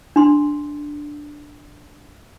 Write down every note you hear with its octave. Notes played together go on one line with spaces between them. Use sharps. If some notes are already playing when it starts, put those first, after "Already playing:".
D4 C6